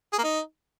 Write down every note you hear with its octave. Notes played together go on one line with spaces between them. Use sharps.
G#4
A#3
D#4